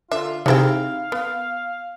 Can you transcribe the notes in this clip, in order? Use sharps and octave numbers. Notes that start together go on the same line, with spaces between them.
D3 F4 E5
C3 D#4 E4 G#4 F5 G5
B3